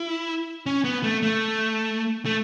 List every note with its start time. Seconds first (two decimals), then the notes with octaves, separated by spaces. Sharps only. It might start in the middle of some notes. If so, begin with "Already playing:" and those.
Already playing: E4
0.66 C#4
0.84 B3
1.03 A3
1.23 A3
2.26 A3